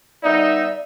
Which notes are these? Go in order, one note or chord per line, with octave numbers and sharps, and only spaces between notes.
G3 B3 D#4 D5 E5